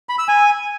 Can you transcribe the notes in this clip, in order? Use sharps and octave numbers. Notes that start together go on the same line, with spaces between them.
B5
E6
G#5